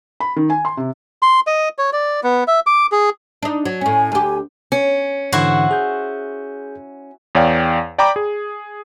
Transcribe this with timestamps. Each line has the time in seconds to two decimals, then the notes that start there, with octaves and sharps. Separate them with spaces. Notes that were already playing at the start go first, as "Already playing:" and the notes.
0.20 B5
0.36 D#3
0.50 G#5
0.65 C6
0.77 C3
1.22 C6
1.47 D#5
1.78 C#5
1.93 D5
2.23 B3
2.48 E5
2.67 D6
2.92 G#4
3.43 D4 D#4
3.65 F#3
3.81 A2 C#4 G#5
4.12 D2 G4
4.72 C#4
5.32 G#2 D3 E3 E4 F#4 C5
5.71 G#4 G6
7.35 E2 C#5 D5 F5 G5
7.98 D5 G5 A#5 B5 D6
8.16 G#4